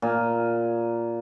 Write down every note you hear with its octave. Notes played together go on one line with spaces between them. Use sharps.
A#2 G#5